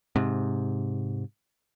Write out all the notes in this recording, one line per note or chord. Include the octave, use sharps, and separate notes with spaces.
G#2 C3